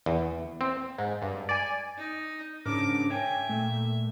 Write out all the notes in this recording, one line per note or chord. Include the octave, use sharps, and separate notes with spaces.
E2
C4
G#2
G2
D5 G#5
D#4
G#2 C#3 D4 A#4 D6
C#5 E5 G5 G#5
A#2 A3